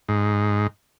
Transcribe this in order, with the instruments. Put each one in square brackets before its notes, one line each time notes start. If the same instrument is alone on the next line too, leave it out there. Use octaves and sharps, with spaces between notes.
[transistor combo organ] G#2